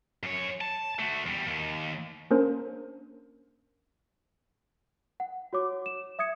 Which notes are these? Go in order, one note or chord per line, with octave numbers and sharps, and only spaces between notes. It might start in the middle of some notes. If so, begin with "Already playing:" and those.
F#2 C#5
A5
A3 F#4
E2 G3
D#2
A#3 C#4 D4 A#4 C5
F#5
F#4 C#5 D6
E7
E5 D#6 G#6 C#7